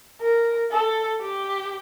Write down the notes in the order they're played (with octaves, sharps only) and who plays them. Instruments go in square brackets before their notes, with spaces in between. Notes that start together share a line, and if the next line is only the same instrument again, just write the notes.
[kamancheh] A#4
A4
G4